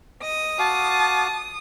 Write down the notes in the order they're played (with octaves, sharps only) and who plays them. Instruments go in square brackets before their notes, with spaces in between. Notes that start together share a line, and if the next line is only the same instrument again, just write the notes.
[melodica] D#5 [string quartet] D#6
[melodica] F#4 F5 D6 [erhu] A5